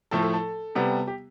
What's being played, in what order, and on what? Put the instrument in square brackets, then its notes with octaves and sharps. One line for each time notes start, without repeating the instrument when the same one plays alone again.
[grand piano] A2 F3 A3 A4
A4
A4
C3 G3 B3
G4